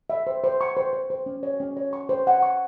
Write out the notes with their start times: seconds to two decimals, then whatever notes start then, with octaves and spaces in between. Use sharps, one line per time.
0.10 E5
0.27 C5
0.44 C5
0.61 C#6
0.77 C5
0.93 C5
1.10 C5
1.26 C#4
1.43 C#5
1.60 C#4
1.77 C#5
1.93 C#6
2.09 C5
2.27 F#5
2.43 C#6